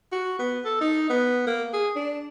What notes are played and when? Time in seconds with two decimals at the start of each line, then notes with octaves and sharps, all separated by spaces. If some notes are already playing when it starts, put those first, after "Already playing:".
0.12 F#4
0.39 B3
0.65 A4
0.81 D#4
1.09 B3
1.46 A#3
1.73 G#4
1.95 D4